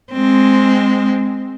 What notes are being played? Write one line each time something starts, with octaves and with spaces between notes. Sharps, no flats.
G#3 C4